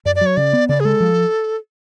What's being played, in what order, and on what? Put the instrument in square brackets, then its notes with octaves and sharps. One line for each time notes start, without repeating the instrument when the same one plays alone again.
[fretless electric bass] F#2 [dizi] D5
[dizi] D5
[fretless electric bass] F#3 [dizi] C#5
[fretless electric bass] C#3 [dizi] D5
[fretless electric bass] B3
[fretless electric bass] C#3 [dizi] D5
[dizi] G#4
[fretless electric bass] G#3 [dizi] A4
[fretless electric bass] F3